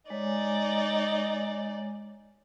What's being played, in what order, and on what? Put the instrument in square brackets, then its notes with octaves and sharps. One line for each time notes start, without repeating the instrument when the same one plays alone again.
[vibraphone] G#3 C#5 G#5 [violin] D#4 D5